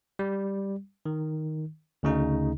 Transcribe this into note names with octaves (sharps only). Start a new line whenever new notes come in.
G3
D#3
D2 C#3 D#4